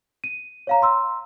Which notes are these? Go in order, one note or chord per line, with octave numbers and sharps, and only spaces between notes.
D#7
C#5 F5 A#5
A#5 C6 E6